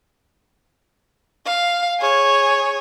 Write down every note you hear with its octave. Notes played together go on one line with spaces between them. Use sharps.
F5
G#4 C#5